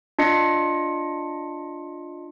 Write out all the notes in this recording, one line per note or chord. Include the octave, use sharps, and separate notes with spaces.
D4 F4 D#5 C#7